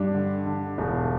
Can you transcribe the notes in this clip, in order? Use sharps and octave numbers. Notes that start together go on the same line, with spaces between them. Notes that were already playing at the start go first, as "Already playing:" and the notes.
Already playing: G2 D4
D3
D3
E1